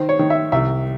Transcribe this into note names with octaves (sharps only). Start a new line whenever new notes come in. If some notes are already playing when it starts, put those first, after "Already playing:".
Already playing: D#3 C5
C#5
D#3
E5
C2 E5